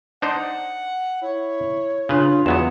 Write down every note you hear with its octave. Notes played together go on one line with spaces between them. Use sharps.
D4 D#4 C5 F#5
E4 C#5
C#3 D4 F4 B4
E2 F#3 B3 F#5 E7